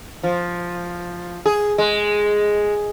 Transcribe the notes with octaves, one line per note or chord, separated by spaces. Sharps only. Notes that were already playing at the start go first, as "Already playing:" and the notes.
F3
G#4
G#3